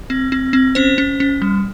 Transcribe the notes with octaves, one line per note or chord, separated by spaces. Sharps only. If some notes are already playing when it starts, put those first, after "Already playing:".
C4
C4
C4
C#4 C5
C#4
C#4
G3